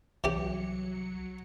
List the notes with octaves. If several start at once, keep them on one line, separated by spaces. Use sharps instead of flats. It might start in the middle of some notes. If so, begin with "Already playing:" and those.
C2 E3 F#3 C#4 G4 C#7